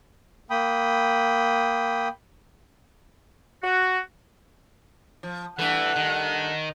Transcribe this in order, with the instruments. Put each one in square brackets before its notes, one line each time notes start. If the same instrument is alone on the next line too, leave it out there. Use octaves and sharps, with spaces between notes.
[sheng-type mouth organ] A#3 G5 B5 D#6
[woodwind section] F#4
[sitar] F3
[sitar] G2 A3 [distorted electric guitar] E3 [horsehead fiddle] F#5
[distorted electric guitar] D#3